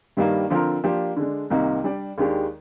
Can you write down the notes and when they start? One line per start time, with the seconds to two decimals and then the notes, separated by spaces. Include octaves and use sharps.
0.17 G2 D#3 G3 A#3
0.50 D3 F3 C4 F4 A#4
0.84 F3 A#3 D4 G4
1.17 D3 G#3 D4
1.50 C2 C3 D#3 A#3 D#4
1.84 G3 D4 G4 D5
2.18 D#2 D#3 G#3 D4 G4